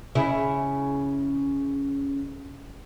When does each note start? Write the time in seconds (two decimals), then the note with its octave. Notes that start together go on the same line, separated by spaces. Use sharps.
0.15 C#3 E4